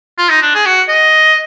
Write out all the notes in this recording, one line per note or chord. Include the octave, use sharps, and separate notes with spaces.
F4
D#4
D4
G#4
F#4
D#5